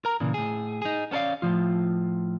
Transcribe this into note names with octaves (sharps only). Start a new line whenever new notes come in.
A#4 A#5
A#2 C#3 E3
A2 G#4
D#4 G#4
B3 C#4 A4 D5 F5
A2 F3 F4